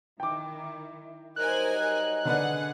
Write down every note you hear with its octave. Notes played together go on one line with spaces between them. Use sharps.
D#3 E4 G5 D6
F#3 G3 D#4 A#4 C5 G#5 F#6
D3 D4 G#4 B4 F#5